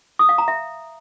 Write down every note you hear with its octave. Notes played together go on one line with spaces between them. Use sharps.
D#6
F5
A#5
E5